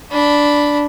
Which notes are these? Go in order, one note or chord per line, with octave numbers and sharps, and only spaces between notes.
D4 B5